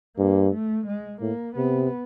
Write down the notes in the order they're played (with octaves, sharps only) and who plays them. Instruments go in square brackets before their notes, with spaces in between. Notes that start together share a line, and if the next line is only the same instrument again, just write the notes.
[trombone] G2 [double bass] A#3
[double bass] A3
G#3
[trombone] A2 [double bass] A#3
[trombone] C3 [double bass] B3